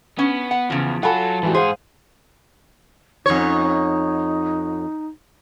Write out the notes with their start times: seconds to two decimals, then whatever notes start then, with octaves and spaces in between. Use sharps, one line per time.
0.19 B3 C#4
0.51 F#5
0.70 E2 C#3 F3
1.03 F#3 F4 F#4 A4 F#5 G#5 B5
1.43 G#2 E3 G3 F#4
1.54 G#2 G#4 C5 F5 F#5 C6
3.26 F2 D#4 C#5